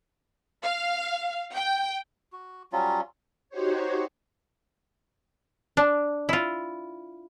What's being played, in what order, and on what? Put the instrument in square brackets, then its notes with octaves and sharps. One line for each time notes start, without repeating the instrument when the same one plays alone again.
[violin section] F5
G5
[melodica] F#4
F#3 G3 C#4 F4
[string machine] D#4 F#4 G4 C5 C#5
[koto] D4
E4 F4